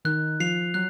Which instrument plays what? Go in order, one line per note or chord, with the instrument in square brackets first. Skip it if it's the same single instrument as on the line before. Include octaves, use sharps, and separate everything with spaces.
[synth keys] D#3 D#4 [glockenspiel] F#6
[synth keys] F3 F4 [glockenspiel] C7 F7
[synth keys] F#3 [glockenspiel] F#6